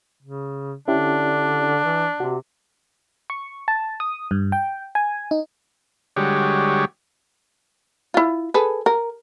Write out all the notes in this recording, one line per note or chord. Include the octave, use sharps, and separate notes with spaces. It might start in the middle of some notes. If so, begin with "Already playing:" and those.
C#3
D3 C#4 D4 E4 G4
E3
C3 F#4
C#6
A5
D#6
G2
G5
G#5
D#4
D3 G3 G#3 F#4 G4 C#5
E4 F4
G#4 A4 B4
A#4